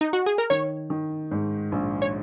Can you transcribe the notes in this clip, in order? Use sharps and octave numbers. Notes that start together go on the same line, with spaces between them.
D#4
F#4
G#4
A#4
D#3 C#5
D#3
G#2
A#1
C#5